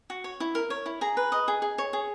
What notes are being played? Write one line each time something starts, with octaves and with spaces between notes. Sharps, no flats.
F#4
C#5
E4
A#4
C#5
E4
G#4 A#5
B4
D#5
G#4
G#4
C#5
G#4